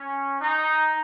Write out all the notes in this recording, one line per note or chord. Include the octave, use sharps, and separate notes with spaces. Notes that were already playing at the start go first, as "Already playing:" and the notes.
Already playing: C#4
D#4